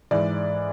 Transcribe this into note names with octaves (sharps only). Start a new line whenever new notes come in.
G#2 E3 G#3 D5